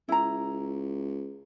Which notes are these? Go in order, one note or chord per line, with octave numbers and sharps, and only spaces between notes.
C#2 E4 A#5